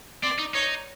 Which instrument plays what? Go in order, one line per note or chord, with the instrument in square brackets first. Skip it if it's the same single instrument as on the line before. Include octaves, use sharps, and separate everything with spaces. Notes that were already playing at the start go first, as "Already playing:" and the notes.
[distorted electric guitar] C4 [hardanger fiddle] D5
[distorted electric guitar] D#4
[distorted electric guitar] D#4 [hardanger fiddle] C#5